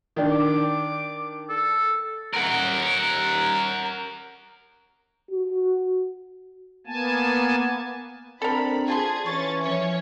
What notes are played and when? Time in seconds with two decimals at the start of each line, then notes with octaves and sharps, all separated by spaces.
0.16 D#3 D4
0.31 D6
1.50 A4
2.34 A#4 F#5
5.31 F#4
6.87 A#3 B3 G#5 A5
8.42 C4 D4 A4 A#4 B5
8.88 F4 G#4 A5 C6 G#6
9.26 E3 C#4 C#6 A6
9.62 F3 C#4 C#5